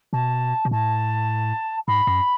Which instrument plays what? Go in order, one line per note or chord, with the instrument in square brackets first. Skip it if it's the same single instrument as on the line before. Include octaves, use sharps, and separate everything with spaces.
[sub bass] B2 [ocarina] A5
[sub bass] B2
[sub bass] A2 [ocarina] A5
[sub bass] G#2 [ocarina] B5
[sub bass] F#2